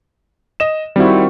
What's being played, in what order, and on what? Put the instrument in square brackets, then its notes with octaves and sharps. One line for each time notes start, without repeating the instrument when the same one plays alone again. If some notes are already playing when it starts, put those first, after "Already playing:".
[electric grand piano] D#5 E7
[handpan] D#3 C4 F#4 [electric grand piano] G3 E4